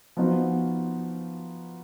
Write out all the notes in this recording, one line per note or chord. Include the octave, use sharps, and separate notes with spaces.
F3 B3 D#4 F#4